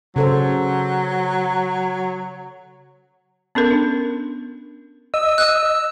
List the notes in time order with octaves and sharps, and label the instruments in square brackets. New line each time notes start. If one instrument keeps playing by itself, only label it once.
[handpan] C#3 A4 C5 [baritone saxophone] F#3
[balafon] B3 C#4 A4 A#4
D4
[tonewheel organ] D#5 [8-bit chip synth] E6
[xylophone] F#6